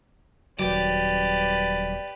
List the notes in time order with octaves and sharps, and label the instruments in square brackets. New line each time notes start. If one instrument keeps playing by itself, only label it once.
[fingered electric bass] D#1 F#3 [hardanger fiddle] G4 B4 [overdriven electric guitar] D5